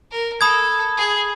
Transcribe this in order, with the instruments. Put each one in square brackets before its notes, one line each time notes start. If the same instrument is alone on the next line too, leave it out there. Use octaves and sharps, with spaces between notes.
[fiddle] A#4
[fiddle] A4 [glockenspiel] B5 D#6 G#6
[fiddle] G#4